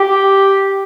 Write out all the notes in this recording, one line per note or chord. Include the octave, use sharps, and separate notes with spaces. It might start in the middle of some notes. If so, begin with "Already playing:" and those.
Already playing: G4